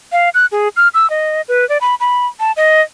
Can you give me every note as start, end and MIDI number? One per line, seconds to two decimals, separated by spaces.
0.12 0.29 77
0.34 0.46 90
0.52 0.68 68
0.76 0.88 89
0.94 1.09 88
1.10 1.41 75
1.48 1.67 71
1.69 1.78 74
1.81 1.95 83
2.00 2.26 83
2.40 2.52 81
2.57 2.81 75